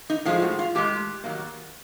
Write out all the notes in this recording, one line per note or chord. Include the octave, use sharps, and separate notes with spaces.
D#4
A2 F3 G#3 F4
F#4
F4
A2 F3 G#3 G4
D#3 F#3 A#3